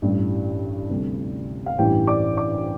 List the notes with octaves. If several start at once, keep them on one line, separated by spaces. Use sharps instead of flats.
A1 G2 E3 G3
D2 C3 G3
F5
A1 G2 E3 G4 G5
D5 D6
D5 D6